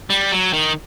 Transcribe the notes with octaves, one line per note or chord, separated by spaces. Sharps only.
G3
F#3
D#3